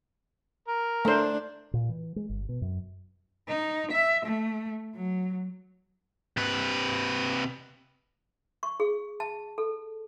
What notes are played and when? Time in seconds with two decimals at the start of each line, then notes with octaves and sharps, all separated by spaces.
0.68 A#4
1.05 A3 D4 C5
1.74 A#2
1.89 E3
2.16 G#3
2.29 G1
2.49 B2
2.61 F#2
3.48 D#4
3.92 E5
4.25 A3
4.95 F#3
6.37 C3 B4
8.63 C#6
8.80 G#4
9.20 A5
9.58 A4